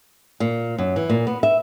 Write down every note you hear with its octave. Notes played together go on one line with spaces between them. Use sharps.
A#2
F#2
E3
A#2
B3
E5